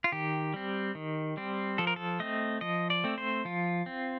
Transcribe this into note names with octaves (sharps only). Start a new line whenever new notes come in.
F4
D#3 G4
G3 C4
D#3
G3 C4
F3 A4
A#4
A4
A3 C4 D#5
F3 D#5
D5
A3 C4
C5
F3 F4
C4